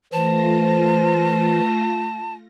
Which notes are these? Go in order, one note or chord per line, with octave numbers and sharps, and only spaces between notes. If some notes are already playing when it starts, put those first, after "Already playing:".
E3 A3 F4 C5 A5 A#6